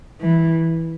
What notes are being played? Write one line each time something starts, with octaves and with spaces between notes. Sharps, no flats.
E3